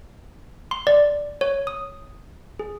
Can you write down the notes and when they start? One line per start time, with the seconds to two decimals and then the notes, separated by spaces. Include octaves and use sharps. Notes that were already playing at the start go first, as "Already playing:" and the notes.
0.71 C6
0.87 D5
1.41 C#5
1.67 D#6
2.59 G#4